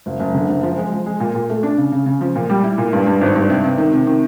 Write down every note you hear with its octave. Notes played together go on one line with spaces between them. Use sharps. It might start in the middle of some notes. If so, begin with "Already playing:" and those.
F#1
F#1
D3
F#1
F3
G#3
F3
G#3
A#2
A#2
A3
D4
C#3
C#3
C#3
F3
A#2
G3
E4
A#2
G2
G2
G#1
G2
C3
C3
D#3
C3
D#3